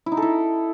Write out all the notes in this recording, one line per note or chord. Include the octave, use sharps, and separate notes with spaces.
E4
D#4
A4
E4